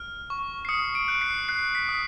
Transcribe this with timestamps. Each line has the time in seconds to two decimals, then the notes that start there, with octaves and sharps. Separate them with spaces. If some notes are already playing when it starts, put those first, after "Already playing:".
Already playing: F6
0.30 C#6
0.65 C7
0.69 D#6 C#7
0.95 D7
1.08 F#6
1.21 C7
1.48 F#6 C7
1.75 B6
1.89 D#6